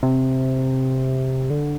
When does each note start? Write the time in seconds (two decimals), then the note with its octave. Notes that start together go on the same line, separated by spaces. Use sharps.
0.03 C3
1.50 D3